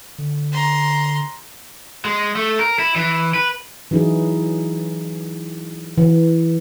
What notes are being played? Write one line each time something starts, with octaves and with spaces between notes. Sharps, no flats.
D3
A#5 C6
G#3
A3
A#4
E4
E3
B4
E3 F#3 D#4 E4 G#4
E3